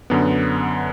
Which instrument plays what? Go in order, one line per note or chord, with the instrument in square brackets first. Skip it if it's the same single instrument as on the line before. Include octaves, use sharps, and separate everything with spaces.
[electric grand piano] F#2 D3 B3